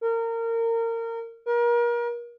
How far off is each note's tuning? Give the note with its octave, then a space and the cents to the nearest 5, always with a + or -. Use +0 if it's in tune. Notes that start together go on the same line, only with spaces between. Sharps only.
A#4 -25
A#4 +35